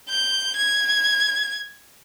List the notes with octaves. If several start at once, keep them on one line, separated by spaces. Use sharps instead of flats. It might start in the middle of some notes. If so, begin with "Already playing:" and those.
G6
G#6